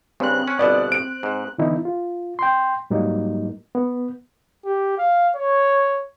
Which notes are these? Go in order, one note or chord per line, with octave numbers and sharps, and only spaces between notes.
G2 C#3 C4 F#6
C#4
G1 B2 B3 D5
D7
G#2
D3 E3 B3 D#4 E4
F4
G5 C6
G#2 F#3 G3 A#3 D#4
B3
G4
F5
C#5